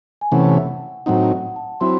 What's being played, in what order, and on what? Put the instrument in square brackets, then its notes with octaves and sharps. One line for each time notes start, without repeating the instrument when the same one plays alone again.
[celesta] G#5
[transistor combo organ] C3 E3 A3 C#4 [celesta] F#5
[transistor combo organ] A2 F#3 C4 D#4 [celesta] F#5
[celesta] A5
[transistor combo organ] F#3 C4 E4 [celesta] C6